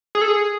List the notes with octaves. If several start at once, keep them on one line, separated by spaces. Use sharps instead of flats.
G#4
A4
G#4